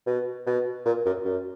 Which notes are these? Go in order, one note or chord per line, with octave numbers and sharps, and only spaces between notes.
B2
B2
A#2
F#2
F#2